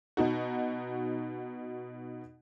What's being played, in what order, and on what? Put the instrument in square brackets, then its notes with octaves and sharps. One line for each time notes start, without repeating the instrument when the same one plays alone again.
[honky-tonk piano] B2 D#4 F#4